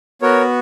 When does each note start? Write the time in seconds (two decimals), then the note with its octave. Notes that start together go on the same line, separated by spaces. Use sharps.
0.22 B3 F#4 A#4 C#5